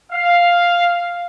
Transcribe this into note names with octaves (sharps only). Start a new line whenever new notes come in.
F5